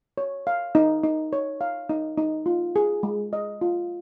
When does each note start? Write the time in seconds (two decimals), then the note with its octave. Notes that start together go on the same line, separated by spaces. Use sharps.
0.18 C#5
0.47 F5
0.75 D#4
1.04 D#4
1.33 C#5
1.61 F5
1.90 D#4
2.18 D#4
2.46 F4
2.76 G#4
3.03 G#3
3.33 D#5
3.61 F4